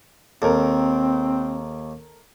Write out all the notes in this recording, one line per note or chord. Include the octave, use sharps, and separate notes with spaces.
D#2 C4 A4 A#4